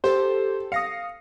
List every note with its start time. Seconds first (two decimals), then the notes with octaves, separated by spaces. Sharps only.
0.04 G4 A4 C5
0.72 F5 D#6 A#6 C#7